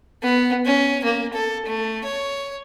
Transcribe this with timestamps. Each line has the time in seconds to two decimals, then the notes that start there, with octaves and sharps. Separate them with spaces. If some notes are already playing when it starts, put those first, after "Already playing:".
0.23 B3
0.65 C#4
1.04 A#3
1.34 A4
1.66 A3
2.04 C#5